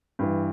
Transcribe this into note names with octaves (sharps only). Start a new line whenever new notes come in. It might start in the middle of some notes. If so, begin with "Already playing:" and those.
G2 E3